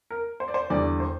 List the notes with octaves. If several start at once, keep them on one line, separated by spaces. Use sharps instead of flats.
A#4
C5
D5
C5
E2 D3 G3 D5
C5